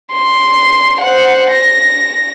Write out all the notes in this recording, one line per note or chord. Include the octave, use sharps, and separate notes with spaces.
C6
C5 F#5
A#6